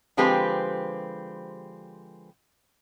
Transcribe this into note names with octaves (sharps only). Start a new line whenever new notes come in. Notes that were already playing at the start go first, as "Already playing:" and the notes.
D3 F3 G#3 C4 G4 B4